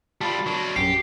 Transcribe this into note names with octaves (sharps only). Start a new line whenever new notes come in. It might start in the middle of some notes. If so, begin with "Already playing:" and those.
G3 F4 A5 B5
F#3 D4
A#1 F#2 G4 C7